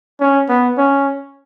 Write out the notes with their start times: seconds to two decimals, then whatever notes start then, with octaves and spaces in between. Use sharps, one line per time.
0.20 C#4
0.49 B3
0.78 C#4